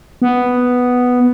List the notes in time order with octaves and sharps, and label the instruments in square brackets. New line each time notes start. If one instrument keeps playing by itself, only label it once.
[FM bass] B3